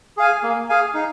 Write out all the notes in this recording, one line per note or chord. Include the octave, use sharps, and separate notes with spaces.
G#4 F5 G#5
A#3
G#4 F5 G#5
D#4